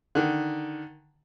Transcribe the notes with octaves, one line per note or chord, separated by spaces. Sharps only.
D3 D#3